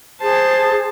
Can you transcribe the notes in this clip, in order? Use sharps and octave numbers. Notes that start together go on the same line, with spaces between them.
G#4 C5 A5